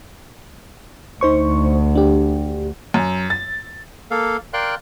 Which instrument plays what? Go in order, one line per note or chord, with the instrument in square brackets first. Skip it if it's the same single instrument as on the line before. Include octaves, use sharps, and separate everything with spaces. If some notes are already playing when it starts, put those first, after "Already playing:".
[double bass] D2 [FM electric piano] D#4 C5 C#6
[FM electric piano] D4 G4
[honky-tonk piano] F#2
A6
[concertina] A#3 A4 F5
A#4 D5 F5 G5 C6 F#6